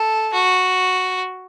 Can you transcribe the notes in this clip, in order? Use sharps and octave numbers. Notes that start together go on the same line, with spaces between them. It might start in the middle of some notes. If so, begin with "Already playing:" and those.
Already playing: A4
F#4